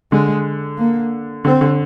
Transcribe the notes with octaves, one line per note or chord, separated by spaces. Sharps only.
D3 G#3
A#3
D3 C4
D3